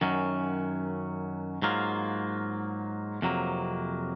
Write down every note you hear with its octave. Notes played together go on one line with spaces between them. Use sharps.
F#2 D#3 F#3 C#4
G#2 F#3 A#3 F4
F2 C3 F#3 A#3